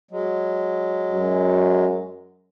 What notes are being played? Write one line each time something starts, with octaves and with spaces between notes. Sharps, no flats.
F#3 G#3
F#2